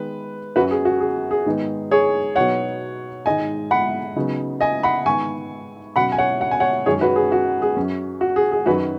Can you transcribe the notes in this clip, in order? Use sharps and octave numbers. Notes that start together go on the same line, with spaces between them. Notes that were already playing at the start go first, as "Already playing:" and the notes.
Already playing: D#3 G#3 B3 B4
F#2 F#3 C#4 F#4 B4
G#4
F#4
G#4
G#4
G#2 D#3 G#3 B3 D#4
G#4 C#5
B2 F#3 B3 D#4 C#5 F#5
G#2 D#3 G#3 D#4 D#5 G#5
F#5 B5
C#3 F#3 B3 D#4
D#5 G#5
F#5 B5
G#2 D#3 B3 G#5 C#6
B2 F#3 C#4 F#5 B5
G#5
C#5 F#5
F#5
G#5
C#5 F#5
F#2 D#3 G#3 C#4 G#4 C#5
F#4 B4
G#4
F#4
G#4
F#2 F#3 C#4
F#4
G#4
G#4
F#2 D#3 F#3 D#4 F#4 B4